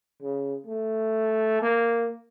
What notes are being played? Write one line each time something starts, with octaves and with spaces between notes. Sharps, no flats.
C#3
A3
A#3